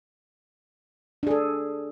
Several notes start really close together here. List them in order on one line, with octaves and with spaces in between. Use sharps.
D4 G#4 A4